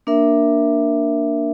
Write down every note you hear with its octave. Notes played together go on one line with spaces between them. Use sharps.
A#3 D4 A#4 E5